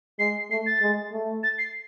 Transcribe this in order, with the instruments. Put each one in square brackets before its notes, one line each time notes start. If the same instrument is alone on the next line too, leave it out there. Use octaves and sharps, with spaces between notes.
[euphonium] G#3 [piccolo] C7
[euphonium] A3 [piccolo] C7
[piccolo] A6
[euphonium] G#3
A3
[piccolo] A6
C7